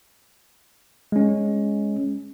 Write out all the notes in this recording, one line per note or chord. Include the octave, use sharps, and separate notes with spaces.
G#3 C#4